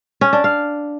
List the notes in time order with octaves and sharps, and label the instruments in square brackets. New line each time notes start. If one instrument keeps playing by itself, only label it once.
[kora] C#4
D4
F5